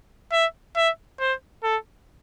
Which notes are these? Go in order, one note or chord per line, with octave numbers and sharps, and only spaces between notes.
E5
E5
C5
A4